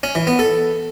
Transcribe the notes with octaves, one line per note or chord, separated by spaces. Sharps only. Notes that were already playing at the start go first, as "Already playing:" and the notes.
C#4
E3
B3
A4